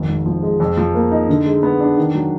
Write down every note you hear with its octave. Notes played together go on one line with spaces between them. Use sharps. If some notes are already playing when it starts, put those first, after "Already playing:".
Already playing: G#1 F2
G#2
F3
G#3
F2
F3
A#3
D#4
D3
G#3
B3
D4
D#3
F#3